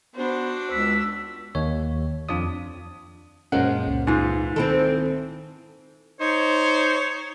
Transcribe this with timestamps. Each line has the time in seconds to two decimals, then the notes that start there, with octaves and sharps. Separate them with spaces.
0.16 B3 D4 F#4 C5
0.72 C#2 E6 B6
1.55 D#2 C#5
2.29 F2 D4 F4 D5 D#6
3.52 F#2 A#2 F3 G#3 A#3 C#4 F#5
3.87 C#2 A#2
4.07 G#2 E3 F4
4.56 D#3 C4 E4 A4
6.20 D#4 C5 C#5